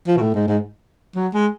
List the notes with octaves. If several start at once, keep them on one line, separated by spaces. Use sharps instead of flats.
F3
B2
A2
G#2
G#2
F#3
G#3